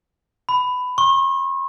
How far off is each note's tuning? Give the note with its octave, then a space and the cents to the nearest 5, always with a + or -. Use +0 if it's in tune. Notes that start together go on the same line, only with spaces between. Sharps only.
B5 +15
C#6 -40